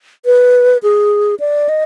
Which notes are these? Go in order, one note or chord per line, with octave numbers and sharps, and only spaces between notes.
B4
G#4
D5
D#5